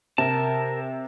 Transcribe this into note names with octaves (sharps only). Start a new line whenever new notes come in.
C3 A#4 A5